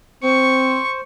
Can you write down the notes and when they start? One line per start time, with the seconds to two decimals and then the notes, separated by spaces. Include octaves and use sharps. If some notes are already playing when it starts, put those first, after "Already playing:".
0.23 C4 C5 C#6